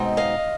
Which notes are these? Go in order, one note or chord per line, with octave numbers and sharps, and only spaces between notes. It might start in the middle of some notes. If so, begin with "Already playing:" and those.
Already playing: B2 G#3 C4 D#4
D#5 F5